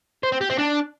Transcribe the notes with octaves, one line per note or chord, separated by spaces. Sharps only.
C5
C4
G4
C4
D4